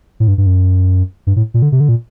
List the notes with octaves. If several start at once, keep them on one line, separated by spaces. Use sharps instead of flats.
A2
G2
G2
F#2
G2
A2
A#2
D3
C3
D3
A#2